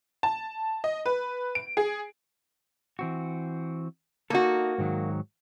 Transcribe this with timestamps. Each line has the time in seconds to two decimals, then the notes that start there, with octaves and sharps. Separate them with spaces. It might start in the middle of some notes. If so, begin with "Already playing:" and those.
0.23 A5
0.84 D#5
1.06 B4
1.55 D7
1.77 G#4
2.99 E3 C4 F#4
4.30 A#3 D#4 F#4 A4
4.78 G#2 D#3 F#3